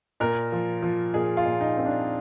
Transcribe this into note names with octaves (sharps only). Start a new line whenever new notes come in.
A#2 A#4
F3
F3
A#2 G#4
F4
A#2
D#4
C4
D4